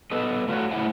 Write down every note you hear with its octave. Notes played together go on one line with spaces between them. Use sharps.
B3 A4 D#5
A3 F4 F#4 C#5
A3 E4 C5 E5 F#5 G#5